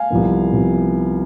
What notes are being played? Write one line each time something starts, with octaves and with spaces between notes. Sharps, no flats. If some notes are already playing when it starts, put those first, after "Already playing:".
Already playing: F5 G#5
C2 C3 F3 B3
C3 F3 B3